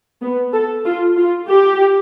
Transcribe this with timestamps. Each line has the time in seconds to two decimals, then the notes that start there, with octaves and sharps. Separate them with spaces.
0.22 B3
0.53 A4
0.85 F4
1.17 F4
1.49 G4